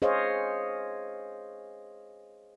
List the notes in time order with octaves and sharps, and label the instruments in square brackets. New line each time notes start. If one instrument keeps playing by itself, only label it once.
[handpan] G#4 C5 C#5 D#5 F5